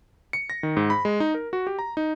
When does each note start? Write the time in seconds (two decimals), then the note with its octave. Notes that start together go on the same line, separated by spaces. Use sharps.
0.33 C#7
0.50 A#6
0.63 D#3
0.77 G#2
0.90 B5
1.05 G#3
1.20 D#4
1.35 A#4
1.53 F#4
1.67 G4
1.79 A#5
1.97 D#4